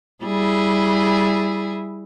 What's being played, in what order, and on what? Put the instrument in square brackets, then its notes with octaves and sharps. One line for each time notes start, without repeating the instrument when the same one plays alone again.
[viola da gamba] G3 E4 G#4